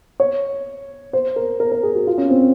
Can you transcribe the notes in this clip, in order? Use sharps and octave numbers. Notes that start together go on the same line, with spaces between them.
C#5
C5
A#4
A#4
A#4
G#4
F#4
F4
C#4
C4